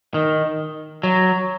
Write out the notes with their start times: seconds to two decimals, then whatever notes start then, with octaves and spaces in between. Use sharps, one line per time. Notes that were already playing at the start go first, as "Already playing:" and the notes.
0.14 D#3
1.03 F#3